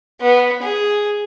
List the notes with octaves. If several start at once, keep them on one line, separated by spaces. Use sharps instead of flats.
B3
G#4